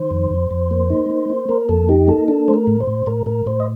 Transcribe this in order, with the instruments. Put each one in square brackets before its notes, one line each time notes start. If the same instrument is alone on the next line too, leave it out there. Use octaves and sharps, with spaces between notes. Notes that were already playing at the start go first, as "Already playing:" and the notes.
Already playing: [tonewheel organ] D#3 C5
F2
F2
F2
A#3
D#4
A#3
A#3
A#3 A#4
F2 A4
D#4 G4
A#3 A4
D4 A4
A3 C5
A#4
A2
C5
A2
A2 A#4
A2 A#4
A2 C5
D#5